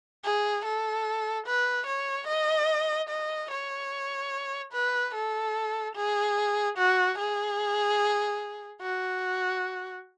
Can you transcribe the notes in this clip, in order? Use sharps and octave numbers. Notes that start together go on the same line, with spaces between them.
G#4
A4
B4
C#5
D#5
D#5
C#5
B4
A4
G#4
F#4
G#4
F#4